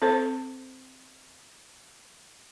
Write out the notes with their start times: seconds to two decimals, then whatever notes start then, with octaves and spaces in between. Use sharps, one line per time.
0.02 C4 A4 C5